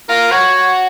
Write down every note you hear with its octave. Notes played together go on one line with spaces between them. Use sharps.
F4 A#4
F#4 C#5